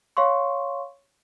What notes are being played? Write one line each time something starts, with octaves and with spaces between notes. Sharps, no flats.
C#5 F5 C6 C#6